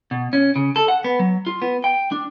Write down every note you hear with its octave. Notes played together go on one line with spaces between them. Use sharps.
B2
C#4
C#3
A4
F#5
B3
F#3
F4
B3
G5
D4